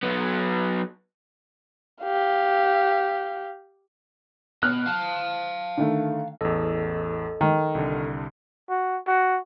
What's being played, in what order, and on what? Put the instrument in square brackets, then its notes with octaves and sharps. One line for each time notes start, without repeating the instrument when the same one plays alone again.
[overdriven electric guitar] F#3 B3
[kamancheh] G4 F5
[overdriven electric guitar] B2 [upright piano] F6 F#6
[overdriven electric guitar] F5 A5
[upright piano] D3 D#3 A3
[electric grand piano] A1 E2 [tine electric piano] A4 D#5
[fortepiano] D#3
[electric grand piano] C2 D3
[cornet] F#4
F#4